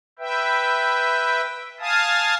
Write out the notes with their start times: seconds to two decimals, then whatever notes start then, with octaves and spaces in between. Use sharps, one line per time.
0.19 B4 E5 G5
1.80 F5 G#5 A5 D#6